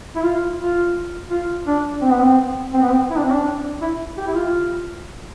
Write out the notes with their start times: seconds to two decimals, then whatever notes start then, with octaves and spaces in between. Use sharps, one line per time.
0.16 E4
0.23 F4
0.59 F4
1.30 F4
1.67 D4
2.02 C4
2.12 B3
2.21 C4
2.74 C4
2.82 B3
2.90 C4
3.10 E4
3.17 D4
3.24 C4
3.32 D4
3.82 E4
4.17 G4
4.27 E4
4.35 F4